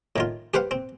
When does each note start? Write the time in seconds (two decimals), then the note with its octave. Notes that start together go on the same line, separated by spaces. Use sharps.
0.16 A2 D#3 F4
0.54 G4 B4 C5 F5 F#5
0.71 C4